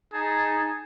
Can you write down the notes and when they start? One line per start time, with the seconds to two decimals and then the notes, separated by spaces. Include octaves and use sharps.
0.13 D#4 G#4 A5